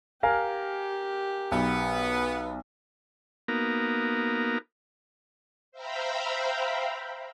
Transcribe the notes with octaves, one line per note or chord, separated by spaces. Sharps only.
G4 A#4 F5 G#5
B1 B3
A#3 B3 D#4 F#4 A#4 F5
C5 E5 F5 G5 A#5 B5